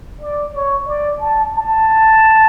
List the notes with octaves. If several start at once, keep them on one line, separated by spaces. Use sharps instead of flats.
D5
C#5
D5
A5
A5